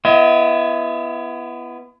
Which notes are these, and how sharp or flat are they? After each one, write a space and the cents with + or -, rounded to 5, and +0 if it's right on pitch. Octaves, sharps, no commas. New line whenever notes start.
B3 +0 E4 +35 D#5 +40